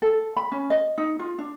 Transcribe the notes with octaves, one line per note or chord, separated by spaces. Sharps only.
A4
B5
C#4
D#5
D#4
F4
D4